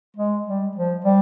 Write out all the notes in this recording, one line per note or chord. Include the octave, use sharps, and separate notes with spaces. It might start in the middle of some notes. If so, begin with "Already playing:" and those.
G#3
G3
F3
G3